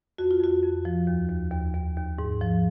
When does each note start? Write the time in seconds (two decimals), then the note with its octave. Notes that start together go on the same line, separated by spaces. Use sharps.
0.18 F2 F#4
0.31 F4
0.40 F2 F#4
0.63 F2
0.85 F3
1.07 D#2
1.30 D#2
1.51 D#2
1.75 D#2
1.97 D#2
2.19 G#2
2.41 F3